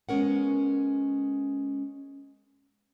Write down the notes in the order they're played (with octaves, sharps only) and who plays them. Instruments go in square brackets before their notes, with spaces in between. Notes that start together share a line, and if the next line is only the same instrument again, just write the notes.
[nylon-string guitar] G#3 B3 C#4 A#4 F#5